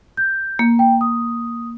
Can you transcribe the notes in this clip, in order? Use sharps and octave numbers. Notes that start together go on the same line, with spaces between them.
G6
A#3
G5
D#6